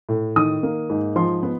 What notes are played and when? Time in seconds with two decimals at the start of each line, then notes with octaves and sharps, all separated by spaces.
0.09 A2
0.36 D#3 D#6
0.63 A#3
0.90 G#2
1.16 F3 C6
1.43 B3